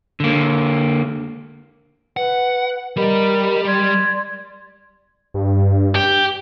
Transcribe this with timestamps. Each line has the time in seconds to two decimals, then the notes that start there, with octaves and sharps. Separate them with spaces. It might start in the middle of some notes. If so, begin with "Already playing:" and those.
0.20 D3 A#3
2.17 B4 F#5
2.97 G3 G4 A#4 D#5 B5
3.67 D5 C6 G#6
5.34 G2
5.95 G4